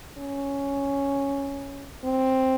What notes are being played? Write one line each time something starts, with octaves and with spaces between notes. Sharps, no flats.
C#4
C4